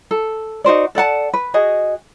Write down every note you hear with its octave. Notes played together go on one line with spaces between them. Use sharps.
A4
D#4 F#4 C5 D5
A4 D5 F#5 A5
B4
F#4 G#4 D#5